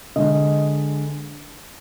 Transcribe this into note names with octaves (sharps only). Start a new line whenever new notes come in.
D3 G#3 D#5